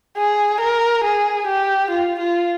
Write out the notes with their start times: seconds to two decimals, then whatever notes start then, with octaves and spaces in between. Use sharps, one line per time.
0.17 G#4
0.60 A#4
1.04 G#4
1.47 G4
1.91 F4
2.19 F4